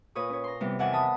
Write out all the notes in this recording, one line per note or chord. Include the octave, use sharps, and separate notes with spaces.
A#2 B4 C#5 D#6
C#4 C#5
A#5 C6
C3 E3 G3 B3
E2 D#3 E3 D5 F#5 G#5
A5 B5 D#6